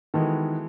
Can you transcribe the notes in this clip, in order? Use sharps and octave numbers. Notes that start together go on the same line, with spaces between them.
D#3 E3 G#3 B3 F#4 A4